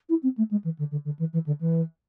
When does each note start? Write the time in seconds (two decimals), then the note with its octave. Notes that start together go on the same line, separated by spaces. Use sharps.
0.09 E4
0.23 C4
0.37 A3
0.51 G#3
0.64 E3
0.78 D3
0.91 D3
1.05 D3
1.19 E3
1.33 E3
1.46 D3
1.60 E3